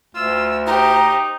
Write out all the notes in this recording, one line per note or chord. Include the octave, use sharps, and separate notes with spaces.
D2 F4 E6
D#4 G4 C5 A#5